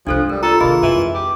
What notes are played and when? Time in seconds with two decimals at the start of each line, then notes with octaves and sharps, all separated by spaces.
0.07 C2 F3 G#3 D4 A4 C5
0.29 G3 A#4
0.43 F4 A4 A#5
0.60 C3 D#3 A#3 G#4 D#5 B5
0.82 F2 E3 G#3
1.14 G4